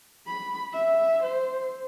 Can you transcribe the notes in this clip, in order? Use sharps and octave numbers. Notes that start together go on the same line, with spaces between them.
B5
E5
C5